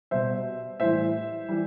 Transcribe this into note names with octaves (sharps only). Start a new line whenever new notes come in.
B2 G3 C5 E5
A2 E3 G3 C5 E5
E3 G3